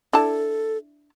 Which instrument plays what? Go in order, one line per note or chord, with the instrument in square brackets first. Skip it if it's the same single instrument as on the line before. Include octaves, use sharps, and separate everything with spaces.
[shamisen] D4 E4 A5 [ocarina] A4